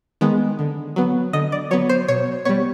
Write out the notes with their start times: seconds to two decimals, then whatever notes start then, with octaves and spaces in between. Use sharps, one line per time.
0.21 D#3 G#3 B3
0.59 D3
0.96 F#3 B3
1.33 D3 D#5
1.52 D5
1.71 F#3 B3 C#5
1.89 C5
2.08 B2 C#5
2.45 G3 B3 C#5